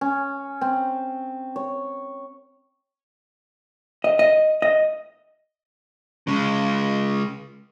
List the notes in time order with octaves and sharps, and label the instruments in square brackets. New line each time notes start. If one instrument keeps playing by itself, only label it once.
[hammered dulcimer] C#4
C4
C#5
[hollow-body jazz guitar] D#5
D#5
D#5
[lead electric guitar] C#3 G#3